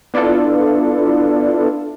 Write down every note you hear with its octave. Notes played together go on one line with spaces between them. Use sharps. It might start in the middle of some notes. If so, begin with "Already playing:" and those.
B3 D4 E4 F4 A4